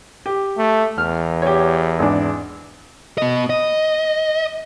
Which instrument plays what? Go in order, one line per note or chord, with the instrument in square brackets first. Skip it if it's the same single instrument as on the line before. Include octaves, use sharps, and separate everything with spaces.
[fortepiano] G4
[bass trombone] A3
[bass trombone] E2 [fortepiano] F6
[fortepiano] G4 C#5
G#1 D4
[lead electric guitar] B3 D#5
D#5